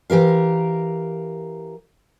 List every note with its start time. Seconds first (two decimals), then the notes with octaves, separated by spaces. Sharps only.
0.10 E3 G4 A#4 F5